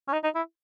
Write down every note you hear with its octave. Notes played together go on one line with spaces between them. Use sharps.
C#4
D#4
D#4
E4